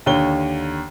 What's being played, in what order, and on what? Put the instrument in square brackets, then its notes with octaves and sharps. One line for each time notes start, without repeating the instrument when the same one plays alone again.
[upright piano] D#2 D3 C#5 G7